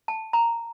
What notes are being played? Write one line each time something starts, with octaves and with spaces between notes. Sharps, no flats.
A5
A#5